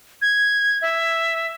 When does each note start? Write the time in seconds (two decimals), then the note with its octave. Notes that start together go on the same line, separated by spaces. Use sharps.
0.22 G#6
0.82 E5